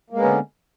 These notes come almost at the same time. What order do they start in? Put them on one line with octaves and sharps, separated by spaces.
A#3 G#3 B3 C#4 D3